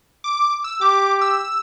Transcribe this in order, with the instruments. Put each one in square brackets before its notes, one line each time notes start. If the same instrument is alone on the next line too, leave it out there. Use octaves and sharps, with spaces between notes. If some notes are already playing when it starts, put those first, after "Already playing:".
[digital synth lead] D6
E6
[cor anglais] G4 [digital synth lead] D6
[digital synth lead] E6